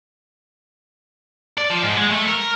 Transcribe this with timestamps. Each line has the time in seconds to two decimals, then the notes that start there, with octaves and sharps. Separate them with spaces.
1.58 D5
1.70 F3
1.82 G#2
1.97 G#3
2.11 A3
2.28 A#4